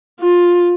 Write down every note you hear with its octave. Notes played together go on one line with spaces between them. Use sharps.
F4